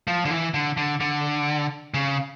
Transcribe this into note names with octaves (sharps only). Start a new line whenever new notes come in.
F3
D3
E3
D3
D3
D3
C#3